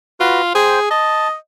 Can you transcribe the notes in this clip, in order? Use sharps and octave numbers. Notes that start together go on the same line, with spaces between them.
F4 F#4 B4
G#4 C5 G5
D#5 A5